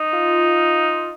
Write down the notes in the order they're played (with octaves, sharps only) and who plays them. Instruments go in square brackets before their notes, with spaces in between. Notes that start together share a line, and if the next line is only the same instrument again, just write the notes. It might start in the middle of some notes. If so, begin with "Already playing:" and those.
Already playing: [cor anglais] D#4
[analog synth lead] F4